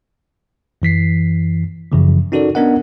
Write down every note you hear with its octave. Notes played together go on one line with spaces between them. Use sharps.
F#2 E3 B6 C7
F#2 C#3 E3 F3
C#4 D#4 F#4 A4 A#4 D5
B3 C#4 D4 A#4 D#5 F#5